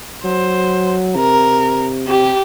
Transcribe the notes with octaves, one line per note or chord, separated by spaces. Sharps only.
F#3 C5
C3 A#4
C3 G4